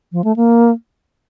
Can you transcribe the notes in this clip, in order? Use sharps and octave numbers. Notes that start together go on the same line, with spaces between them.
F3
A3
A#3